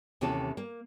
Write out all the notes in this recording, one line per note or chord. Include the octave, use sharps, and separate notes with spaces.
D#2 C3 E3 C#4 E4 A4
A#3